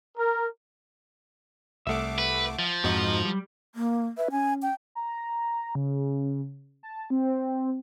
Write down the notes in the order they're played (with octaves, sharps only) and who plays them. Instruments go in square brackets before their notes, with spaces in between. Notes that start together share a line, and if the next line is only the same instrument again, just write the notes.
[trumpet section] A#4
[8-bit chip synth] C2 A3 D6 [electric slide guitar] E5 F#5
[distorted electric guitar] B4
F3
[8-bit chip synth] F2 D#4 [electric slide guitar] G#2 F#4
[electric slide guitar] G3
[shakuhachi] A#3
[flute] B4 [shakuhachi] E5
[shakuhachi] C#4 [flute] G#5
[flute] G5
[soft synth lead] A#5
C#3
A5
C4